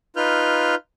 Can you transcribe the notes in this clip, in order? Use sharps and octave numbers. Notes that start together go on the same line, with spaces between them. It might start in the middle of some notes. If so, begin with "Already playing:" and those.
D#4 F4 B4 F6 G6